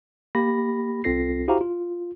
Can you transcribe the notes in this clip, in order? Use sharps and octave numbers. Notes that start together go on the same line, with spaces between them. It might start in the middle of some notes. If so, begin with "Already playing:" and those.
A#3 G4 B5 A#6
C2 C4 F4 A4 A#6 C7
E4 F#4 G4 C5 F5 A#5
F4